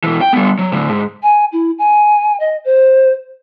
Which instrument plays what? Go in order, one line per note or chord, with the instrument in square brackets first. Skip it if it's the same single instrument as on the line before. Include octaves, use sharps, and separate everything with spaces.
[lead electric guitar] B2 E3
G5
G3 B3
F#3
A2 D3
G#2
[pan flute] G#5
E4
G#5
D#5
C5